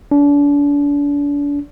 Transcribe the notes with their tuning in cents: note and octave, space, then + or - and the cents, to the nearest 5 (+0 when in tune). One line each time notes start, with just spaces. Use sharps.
D4 -35